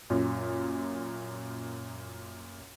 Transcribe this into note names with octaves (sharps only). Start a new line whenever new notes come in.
F#2 A#2